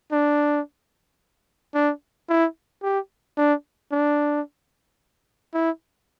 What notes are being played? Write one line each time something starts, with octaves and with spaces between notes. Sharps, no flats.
D4
D4
E4
G4
D4
D4
E4